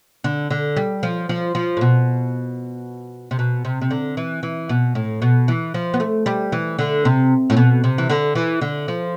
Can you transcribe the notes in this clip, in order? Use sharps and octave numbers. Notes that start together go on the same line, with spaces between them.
D3
D3
G3
F3
F3
F3
A2
B2
C3
B2
C3
C3
D3
E3
E3
B2
A2
B2
E3
F3
B3
A3
G3
E3
D3
C3
A2
B2
C3
E3
D3
E3
D3
F3